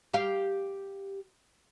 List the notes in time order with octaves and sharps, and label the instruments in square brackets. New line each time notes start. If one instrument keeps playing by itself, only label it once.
[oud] G4 F5